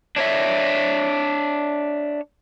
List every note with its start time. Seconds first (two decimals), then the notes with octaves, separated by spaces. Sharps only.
0.16 D4 C#5 E5